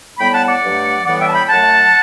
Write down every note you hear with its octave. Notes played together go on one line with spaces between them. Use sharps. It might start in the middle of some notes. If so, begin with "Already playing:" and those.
A2 G3 B3 G5 B5
F#5 A5
D5 F#5
G2 F#3 A3
A2 E3 G3 B3 D5 F#5
E5 G5
A5
G5 B5
F#2 F#3 A3 F#5 A5